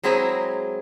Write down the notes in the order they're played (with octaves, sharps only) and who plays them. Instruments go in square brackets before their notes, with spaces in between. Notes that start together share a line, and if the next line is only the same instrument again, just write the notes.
[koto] F#3 G#3 C4 E4 G#4 A#5